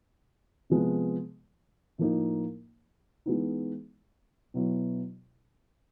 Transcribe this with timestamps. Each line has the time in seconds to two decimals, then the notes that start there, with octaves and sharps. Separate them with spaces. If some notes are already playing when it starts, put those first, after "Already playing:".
0.70 C3 F3 G#3 B3
1.98 A2 F3 A#3 D#4
3.26 E3 G#3 B3 D#4
4.54 B2 F#3 B3 E4